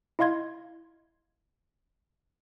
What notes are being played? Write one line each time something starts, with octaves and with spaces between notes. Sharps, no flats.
E4 D#5 F5 C6 G#6